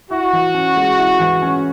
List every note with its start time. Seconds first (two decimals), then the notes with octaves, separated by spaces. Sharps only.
0.10 E4 F#4
0.33 E3
0.54 C#4
0.76 G#3
0.98 E4
1.20 E3
1.42 C#4